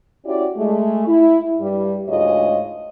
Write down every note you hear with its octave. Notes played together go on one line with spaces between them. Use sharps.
C#4 E4 F#4 G4 D5
G#3 A3
E4
G2 G3
D2 G#2 G#3 F4 C#5 D#5